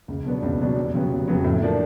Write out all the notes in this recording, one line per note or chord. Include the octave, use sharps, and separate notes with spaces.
C#2
B2 F#3 B3 D4
C#2
B2 F#3 B3 D4
F1
F2 C#3 F#3 B3
F1
F2 C#3 F#3 B3
A2
F3 A#3 D4